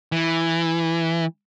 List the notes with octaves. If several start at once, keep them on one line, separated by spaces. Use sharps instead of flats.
E3